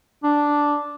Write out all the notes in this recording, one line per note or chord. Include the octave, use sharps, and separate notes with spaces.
D4